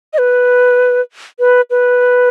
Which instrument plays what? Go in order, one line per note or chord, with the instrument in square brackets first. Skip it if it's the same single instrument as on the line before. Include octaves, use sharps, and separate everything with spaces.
[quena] D#5
B4
B4
B4